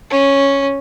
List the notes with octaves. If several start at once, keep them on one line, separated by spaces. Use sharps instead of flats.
C#4